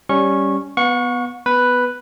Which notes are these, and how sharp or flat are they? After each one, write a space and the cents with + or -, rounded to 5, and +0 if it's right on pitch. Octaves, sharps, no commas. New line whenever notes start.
G3 +0 C#4 +5 C#6 -15
B3 +0 F#5 -45 C#6 +0
B3 +5 B4 +0